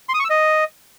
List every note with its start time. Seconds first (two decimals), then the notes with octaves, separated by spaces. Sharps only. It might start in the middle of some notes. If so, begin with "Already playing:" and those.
0.09 C6
0.14 D#6
0.19 C#6
0.25 E6
0.30 D#5